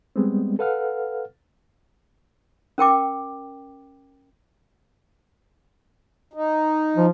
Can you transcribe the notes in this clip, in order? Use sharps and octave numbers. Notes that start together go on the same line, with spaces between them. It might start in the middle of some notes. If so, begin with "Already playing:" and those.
G3 G#3 B3 C4
A4 B4 F5 F#5 F6
C#4 A#4 G5 D6
D#4
F3